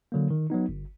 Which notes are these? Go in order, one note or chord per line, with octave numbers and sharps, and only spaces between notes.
D3 F#3 A#3
D#3
F#3 B3 D#4
G1